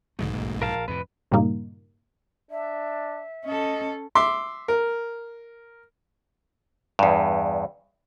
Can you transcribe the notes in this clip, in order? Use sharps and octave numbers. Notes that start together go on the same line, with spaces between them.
B1 G#2 D3 G#3 A3
E1 A1 A#3
A#1 A#4 F5 A5
F2 A2 C3 B4
G2 A#2 C#3 G3 A#3 D#4
D4 E5
C#4 A4 D#5
E5 C6 D6
A#4
E2 G2